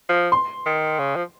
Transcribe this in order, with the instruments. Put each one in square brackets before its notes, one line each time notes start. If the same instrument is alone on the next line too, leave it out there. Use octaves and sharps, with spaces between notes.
[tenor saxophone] F3
[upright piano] C6
[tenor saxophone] D#3
C#3
F3